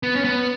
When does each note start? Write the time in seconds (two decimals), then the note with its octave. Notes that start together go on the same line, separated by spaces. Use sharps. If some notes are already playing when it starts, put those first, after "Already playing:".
0.03 B3
0.16 C#4
0.24 B3